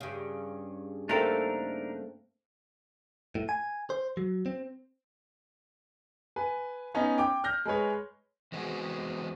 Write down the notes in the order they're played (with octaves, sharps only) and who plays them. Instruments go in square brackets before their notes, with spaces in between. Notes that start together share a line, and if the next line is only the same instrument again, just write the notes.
[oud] G2 C#3
[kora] A3 C4 [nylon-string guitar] A#3 A4 [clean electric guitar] D4 D#4 A#4
[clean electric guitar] A2
G#5
C5
F#3
C4
[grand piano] B4 G#5
B3 C#4 D#4 C#5
G5 D6
F6 G6 A#6
G#3 G#4 B4 C#5
[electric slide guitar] E2 G#3 B3 C4 F#4 G#4